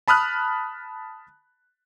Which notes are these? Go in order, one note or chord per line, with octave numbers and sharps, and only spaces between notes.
A5 B5 D#6 F6 F#6